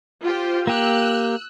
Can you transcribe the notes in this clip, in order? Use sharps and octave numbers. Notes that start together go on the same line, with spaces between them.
F4 G4 C5
A#3 G4 E6 F#6